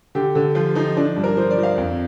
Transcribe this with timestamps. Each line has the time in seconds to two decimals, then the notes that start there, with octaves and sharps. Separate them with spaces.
0.15 D3 G4
0.35 D3
0.55 F3 F4
0.75 F3 D#4
0.97 F3 D4
1.16 G2
1.24 A#4
1.37 F3 C5
1.51 D5
1.58 F3
1.63 F5
1.78 F2